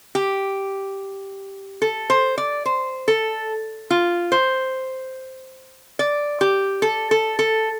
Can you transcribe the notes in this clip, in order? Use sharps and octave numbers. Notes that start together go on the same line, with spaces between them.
G4
A4
C5
D5
C5
A4
F4
C5
D5
G4
A4
A4
A4